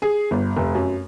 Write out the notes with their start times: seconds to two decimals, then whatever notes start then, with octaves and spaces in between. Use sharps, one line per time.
0.02 G#4
0.31 G1
0.56 F1
0.75 F#2